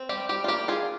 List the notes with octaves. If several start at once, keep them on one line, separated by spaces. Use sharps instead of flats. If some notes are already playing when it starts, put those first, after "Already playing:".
Already playing: C4
G3 G4
G3 G4
F4
A#3 G4
F4 G#4